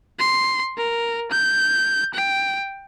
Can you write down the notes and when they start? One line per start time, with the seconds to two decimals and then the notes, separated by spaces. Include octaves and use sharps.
0.19 C6
0.78 A#4
1.31 G6
2.14 G5